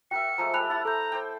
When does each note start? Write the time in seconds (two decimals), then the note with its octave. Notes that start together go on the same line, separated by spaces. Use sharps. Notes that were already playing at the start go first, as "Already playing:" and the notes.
0.11 F#4 A#4 E5 G5 C#7
0.38 F3 G#3 A3 A#5
0.54 G3 G4 A4 B5 F#6 F7
0.70 E4 F#5 A6
0.85 A4 A#5 G6
1.12 C5 D5 G5